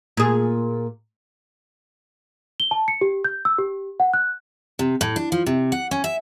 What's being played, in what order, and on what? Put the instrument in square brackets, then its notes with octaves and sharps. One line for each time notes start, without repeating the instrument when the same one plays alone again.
[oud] A#2 G#4
[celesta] G7
A5
C#7
G4
G6
E6
G4
F#5
F#6
[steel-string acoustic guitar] C3
A2
D4
F3
C3
F#5
C#4
E5